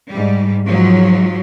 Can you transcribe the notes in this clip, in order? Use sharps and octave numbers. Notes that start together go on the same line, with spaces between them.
G#2 G3
G#2 F3 F#3